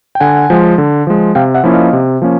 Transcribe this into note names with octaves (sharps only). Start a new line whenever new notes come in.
G5
D3 F#5 G#5
F3 G#3
D3
F3 G#3
C3 F5 G5
E5 F#5
F3 A#3 C#4 E4
D#5 F5
C3
F3 A#3 C#4